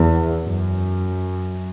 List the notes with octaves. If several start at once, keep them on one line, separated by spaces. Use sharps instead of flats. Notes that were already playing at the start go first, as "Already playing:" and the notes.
Already playing: E2
F#2